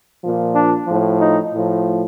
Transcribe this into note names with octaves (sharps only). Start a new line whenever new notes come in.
A#2 F3
D4
A2 F3
D#4
A2 F3